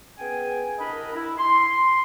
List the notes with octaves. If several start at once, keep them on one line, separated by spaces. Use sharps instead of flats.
B3 C#4 G#4 G5 G#5
C2 D4 A#4 D#5 B5
E4
C6